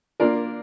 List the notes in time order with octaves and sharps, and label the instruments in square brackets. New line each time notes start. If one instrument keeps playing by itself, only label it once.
[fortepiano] A#3 D4 F4 A#4 D5